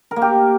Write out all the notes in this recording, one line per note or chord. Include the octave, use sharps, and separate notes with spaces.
A#4
A#3
G4